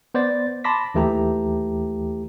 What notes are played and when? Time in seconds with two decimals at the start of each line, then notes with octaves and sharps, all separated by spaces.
0.14 B3 C5 D5 A6
0.64 A5 B5 C6 D6 A#6 B6
0.94 D#2 E3 A3 G4 A#5